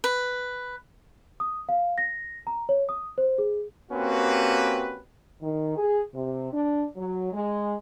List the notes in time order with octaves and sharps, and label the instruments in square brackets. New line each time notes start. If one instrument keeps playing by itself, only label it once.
[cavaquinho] B4
[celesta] D#6
F5
A#6
A#5
C#5
D#6
C5
G#4
[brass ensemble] A#3 C4 C#4 F#4 G4 B4
[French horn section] D#3
G#4
C3
D4
F#3
G#3